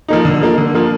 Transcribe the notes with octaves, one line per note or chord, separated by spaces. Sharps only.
F3 A#3 D#4
D3
F3 A#3
D3
F3 A#3